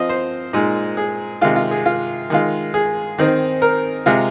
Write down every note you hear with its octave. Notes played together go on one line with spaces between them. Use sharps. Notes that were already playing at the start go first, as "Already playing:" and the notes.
Already playing: F3 C4 D#5 F5
C5
A#2 G#3 D#4
G#4
C3 D#3 G#3 F4
F4
G#4
F4
D#3 G#3 F4
G#4
D#3 C4 D#4
A#4
C3 G#3 F4